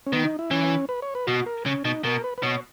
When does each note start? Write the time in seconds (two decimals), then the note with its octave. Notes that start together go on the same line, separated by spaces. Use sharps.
0.07 C#4
0.12 D#3 B3
0.25 D#4
0.39 E4
0.51 E3 C#4
0.89 B4
1.02 C#5
1.15 B4
1.27 B2 F#4
1.46 A#4
1.66 C#3 C#4
1.85 B2 D#4
2.04 B2 A#4
2.24 B4
2.38 B4
2.43 B2 C#5